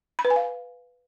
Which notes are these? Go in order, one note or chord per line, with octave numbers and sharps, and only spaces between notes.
B5
B4
G#5
F5